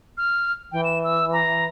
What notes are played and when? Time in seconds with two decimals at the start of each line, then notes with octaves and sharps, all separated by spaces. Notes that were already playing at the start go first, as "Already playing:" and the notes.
0.18 F6
0.72 E3 G5
0.84 E7
1.04 E6
1.33 A#5